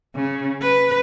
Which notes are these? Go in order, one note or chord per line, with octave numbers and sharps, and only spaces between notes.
C#3
B4